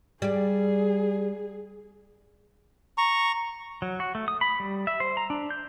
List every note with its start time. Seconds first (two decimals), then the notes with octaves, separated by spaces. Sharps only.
0.22 G3 G#4 D5
2.98 A#5 C#6
3.82 F#3
4.00 F#4
4.15 A3
4.28 D#6
4.41 B5
4.60 G3
4.87 E5
5.00 C5
5.17 A#5
5.30 D4
5.50 G6